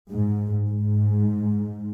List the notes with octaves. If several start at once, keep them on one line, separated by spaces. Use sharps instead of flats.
G#2
G#2